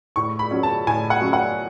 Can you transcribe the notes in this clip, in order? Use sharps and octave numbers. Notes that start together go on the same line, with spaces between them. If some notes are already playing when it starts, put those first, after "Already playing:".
A2 C#6
B5
F#3 C#4
A5
A2 G#5
F#5
F#3 C#4
F#5